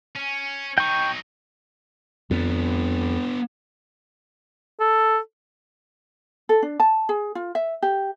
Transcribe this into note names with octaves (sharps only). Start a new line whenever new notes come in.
C#4
F#3 D#4 G5 C#6
F2 B3 D4
A4
A4
D4
A5
G#4
F4
E5
G4